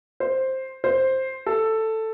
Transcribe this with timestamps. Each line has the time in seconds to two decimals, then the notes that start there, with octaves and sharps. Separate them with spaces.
0.20 C5
0.84 C5
1.46 A4